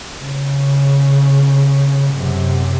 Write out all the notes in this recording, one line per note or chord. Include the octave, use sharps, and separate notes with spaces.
C#3
F#2 C3